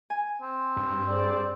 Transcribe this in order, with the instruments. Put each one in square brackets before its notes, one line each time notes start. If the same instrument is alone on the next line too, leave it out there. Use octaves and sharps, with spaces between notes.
[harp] G#5
[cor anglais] C4
[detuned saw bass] G2
[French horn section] G#4 C5 D5